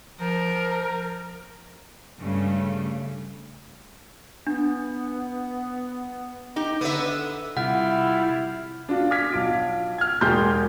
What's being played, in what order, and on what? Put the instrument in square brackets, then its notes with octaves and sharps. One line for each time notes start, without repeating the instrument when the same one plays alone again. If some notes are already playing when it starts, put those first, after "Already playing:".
[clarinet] F3 [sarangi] A#4
[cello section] G2 C#3 A3
[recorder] B3 [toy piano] D4
[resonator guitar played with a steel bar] D#4 G4
[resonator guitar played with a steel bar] D3 [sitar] B3 E5
[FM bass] C3 [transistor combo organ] G3 F4 [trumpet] E4 [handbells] F#5
[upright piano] D4 F4 F#4
D6 F6 G#6 B6
B1 F4 D7
F6 G#6
E1 F#3 G4 G#4 C6 G6